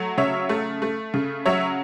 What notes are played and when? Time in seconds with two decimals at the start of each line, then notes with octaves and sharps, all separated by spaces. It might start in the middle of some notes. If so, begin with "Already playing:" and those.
Already playing: F#3 A3
0.18 C#3 C#5 E5
0.49 A3
0.82 A3
1.14 C#3
1.46 F#3 C#5 E5